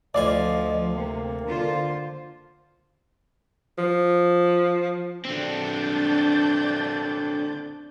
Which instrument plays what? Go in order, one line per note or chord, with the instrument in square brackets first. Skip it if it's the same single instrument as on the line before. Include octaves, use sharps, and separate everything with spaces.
[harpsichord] D2 F4 G#5 [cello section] F3 [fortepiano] D5 [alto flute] D#5
[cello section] C3 [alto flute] A#3
[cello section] D3 F4 C5
[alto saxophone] F3
[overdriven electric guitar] D3 C4 [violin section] D4 G6 A6